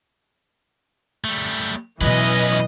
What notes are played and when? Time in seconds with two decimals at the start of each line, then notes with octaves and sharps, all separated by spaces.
1.24 G3 A3
2.01 B2 E3 F#3 C#4 B4 D#5